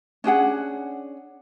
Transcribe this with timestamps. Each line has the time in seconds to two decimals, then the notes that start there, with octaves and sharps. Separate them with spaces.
0.24 C#4 D4 G#4 F#5